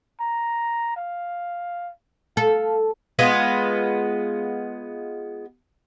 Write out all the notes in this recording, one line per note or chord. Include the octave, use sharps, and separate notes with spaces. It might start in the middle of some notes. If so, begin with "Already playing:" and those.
A#5
F5
A4 F5
G#3 B3 F4